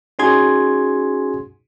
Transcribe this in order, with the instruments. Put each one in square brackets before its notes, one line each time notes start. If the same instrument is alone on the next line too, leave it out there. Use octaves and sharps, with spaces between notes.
[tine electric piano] C#4 D#4 F#4 G#4 C6 G#6